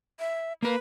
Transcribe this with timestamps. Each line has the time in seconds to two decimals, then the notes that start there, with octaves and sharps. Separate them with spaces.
0.20 E5
0.63 A#3 A#4 B4